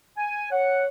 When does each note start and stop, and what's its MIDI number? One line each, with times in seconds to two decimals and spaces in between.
0.17 0.49 80
0.51 0.87 73
0.51 0.85 78